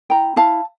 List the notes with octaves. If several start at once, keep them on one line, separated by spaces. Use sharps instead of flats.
E4 G5 A#5
E4 F5 A5